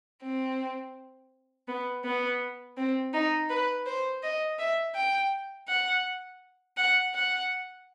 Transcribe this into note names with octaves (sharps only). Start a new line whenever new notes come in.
C4
B3
B3
C4
D#4
B4
C5
D#5
E5
G5
F#5
F#5
F#5